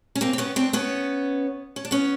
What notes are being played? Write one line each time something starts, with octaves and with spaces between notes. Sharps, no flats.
C#4
A#3 C4
C4
B3 C#4
C4 D4
B3 C#4
C#4
D4
B3 C#4